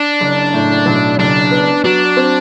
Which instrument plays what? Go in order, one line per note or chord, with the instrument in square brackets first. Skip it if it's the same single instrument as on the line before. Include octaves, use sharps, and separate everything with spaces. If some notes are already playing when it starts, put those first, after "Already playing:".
Already playing: [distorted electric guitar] D4
[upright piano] F#1
A2
B1
[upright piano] F#1 [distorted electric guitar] D4
[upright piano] B3
[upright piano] F#3 [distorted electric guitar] D4
[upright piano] C4